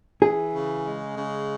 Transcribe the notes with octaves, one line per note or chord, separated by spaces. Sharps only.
E3 G#4
C#3
G#3
C#3